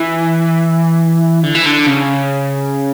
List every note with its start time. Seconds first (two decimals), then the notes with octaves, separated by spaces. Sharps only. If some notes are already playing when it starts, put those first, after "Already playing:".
Already playing: E3
1.44 D3
1.55 E3
1.66 D3
1.87 C#3